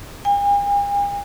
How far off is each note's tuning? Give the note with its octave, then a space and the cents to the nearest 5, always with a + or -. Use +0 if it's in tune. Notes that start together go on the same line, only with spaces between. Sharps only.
G#5 -45